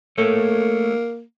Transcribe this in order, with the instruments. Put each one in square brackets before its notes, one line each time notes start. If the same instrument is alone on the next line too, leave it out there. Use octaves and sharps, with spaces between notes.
[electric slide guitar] A3 A4 C#5 [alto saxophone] A#3